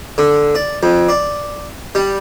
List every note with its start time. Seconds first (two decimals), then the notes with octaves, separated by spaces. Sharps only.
0.18 D3
0.55 D5
0.83 F2
1.09 D5
1.95 G3